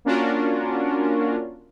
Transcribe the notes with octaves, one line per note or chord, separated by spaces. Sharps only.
A#3 C#4 D4 F4 F#4 A#4